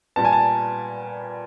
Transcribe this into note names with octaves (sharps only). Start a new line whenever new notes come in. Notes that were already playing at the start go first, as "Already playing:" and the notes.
A#2 G3 B3 A5
G#5
A5